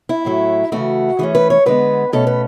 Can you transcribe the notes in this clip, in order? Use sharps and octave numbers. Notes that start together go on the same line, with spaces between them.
E4
A2 F#3 A3
C#3 E3 A3 F#4
E3 A3 C#4 G#4
B4
C#5
D3 G#3 B3 B4
B2 A3 C#4 A4
B4